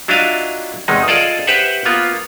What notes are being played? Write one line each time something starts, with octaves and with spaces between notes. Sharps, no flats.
F#3 D4 E4 F4 D#5 F5
E2 C3 D#3 G#3 D#4
F4 G#4 A4 D5 D#5
G4 B4 C5 E5 F#5
A#3 B3 F4